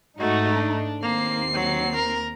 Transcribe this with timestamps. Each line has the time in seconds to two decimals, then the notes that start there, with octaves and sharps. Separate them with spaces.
0.19 G#2 A3 D#4 F#4
0.54 D4
1.03 D#2 A#3 C4 C7
1.53 F#3
1.95 A#4